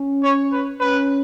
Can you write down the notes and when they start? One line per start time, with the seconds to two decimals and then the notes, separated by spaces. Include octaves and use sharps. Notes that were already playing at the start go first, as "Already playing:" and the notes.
Already playing: C#4
0.23 C#5
0.52 B4
0.80 C#4 B4